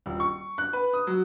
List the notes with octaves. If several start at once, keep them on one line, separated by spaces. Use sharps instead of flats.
D#1
C#6
F#6
B4
D#6
F#3